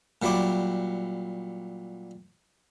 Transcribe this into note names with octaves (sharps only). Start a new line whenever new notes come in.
A#2 F#3 G3 E4 D6